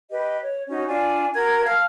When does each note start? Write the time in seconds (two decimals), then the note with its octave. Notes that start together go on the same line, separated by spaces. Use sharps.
0.11 G4 B4 D#5
0.42 C#5
0.69 C#4 D#4 F#4
0.88 D4 F4 D5 G#5
1.35 F#4 A#4 A#5 G#6
1.66 F5 A5 F6